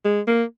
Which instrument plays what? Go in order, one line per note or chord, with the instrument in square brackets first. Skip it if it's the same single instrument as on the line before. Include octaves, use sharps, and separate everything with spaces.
[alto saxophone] G#3
A#3